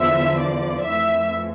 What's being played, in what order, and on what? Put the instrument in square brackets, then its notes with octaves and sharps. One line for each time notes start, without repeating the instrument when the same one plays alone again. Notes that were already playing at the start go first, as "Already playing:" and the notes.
Already playing: [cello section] E2 D3 F3 [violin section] E5
[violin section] D5
[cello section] F2 E3 A3 [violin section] E5